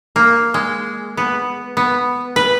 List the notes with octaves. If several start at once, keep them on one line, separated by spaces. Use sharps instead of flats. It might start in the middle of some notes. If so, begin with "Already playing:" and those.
A#3
G#3
B3
B3
B4